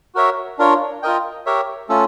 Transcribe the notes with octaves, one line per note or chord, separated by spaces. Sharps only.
F#4 A#4 C#5 E5
D4 F4 A#4 C#5
F4 A#4 D#5 G5
G4 A#4 C#5 E5
A3 C#4 F4 A4